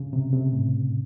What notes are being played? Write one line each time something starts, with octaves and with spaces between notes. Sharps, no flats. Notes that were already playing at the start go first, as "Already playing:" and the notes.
Already playing: C#3
C3
C3
A2